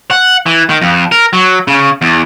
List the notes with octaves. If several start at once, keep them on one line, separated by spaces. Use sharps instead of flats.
F#5
E3
D#3
F2
A#4
F#3
C#3
E2